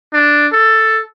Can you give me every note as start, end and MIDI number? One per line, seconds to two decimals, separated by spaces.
0.13 0.47 62
0.53 1.02 69